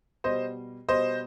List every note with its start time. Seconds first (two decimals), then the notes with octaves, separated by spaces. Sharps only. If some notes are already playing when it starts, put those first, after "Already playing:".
0.24 B2 G3 C5 D#5
0.89 B2 G3 C5 D#5